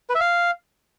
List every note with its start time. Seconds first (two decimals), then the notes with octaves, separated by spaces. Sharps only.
0.10 B4
0.15 E5
0.20 F5